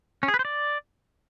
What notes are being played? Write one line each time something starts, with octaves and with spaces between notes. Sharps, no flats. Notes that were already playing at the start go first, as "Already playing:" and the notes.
C#4
G#4
B4
C5
D5